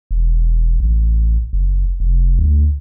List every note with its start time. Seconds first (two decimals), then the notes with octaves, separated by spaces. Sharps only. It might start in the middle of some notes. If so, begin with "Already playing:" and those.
0.11 E1
0.80 A1
1.53 F#1
2.00 F1
2.39 D2